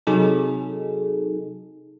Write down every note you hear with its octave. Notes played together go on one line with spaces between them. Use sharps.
C3 F#3 D#4 G#4 A4